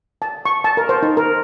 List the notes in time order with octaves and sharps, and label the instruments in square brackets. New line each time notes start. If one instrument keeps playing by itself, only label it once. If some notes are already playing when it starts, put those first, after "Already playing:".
[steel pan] A5
C#6
A5
A#4
C5
D#4
A#4